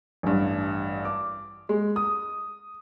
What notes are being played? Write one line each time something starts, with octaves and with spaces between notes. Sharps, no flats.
A1 G2
D6
G#3
D#6